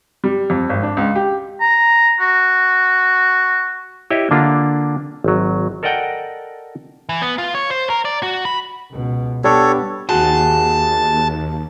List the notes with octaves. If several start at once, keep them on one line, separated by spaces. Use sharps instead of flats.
G3
F2
G#1
D4
C#2
G4
A#5
F#4
E4 G4 C#5 D#5 E5
D3 A#3 D4 F4
G#1 F#3
A4 A#4 D5 D#5 F#5 G5
E3
B3
F4
C#5
C5
A#4
D5
F#4
B5
C#2 B2
G3 B3 D4 G4 A4 C#5
D#2 F#4 G#4 C5 A5